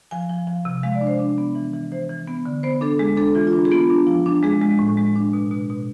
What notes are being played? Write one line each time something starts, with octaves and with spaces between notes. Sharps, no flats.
F3 G#5
F3
F3
C3
G#3 F5
D5
D4
C5
D4
B3
E3
E3
E3 C5
E3
B3
D3
B3 C5
D4 A4
G#3 G#4
D4 A4
E3 F4
F4
D4
G#4
B3 F4
D4
F3
D4
G#3 G#4
G#3
A2
G#3
D4
B2
B2
B2